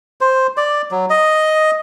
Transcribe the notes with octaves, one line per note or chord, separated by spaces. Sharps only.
C5
D5
F#3
D#5